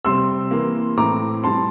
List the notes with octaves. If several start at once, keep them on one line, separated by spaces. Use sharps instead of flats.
C3 G3 C4 C6 E6
E3 A#3
A2 E3 A3 C4 A#5 D6
A2 G3 C4 A5 C6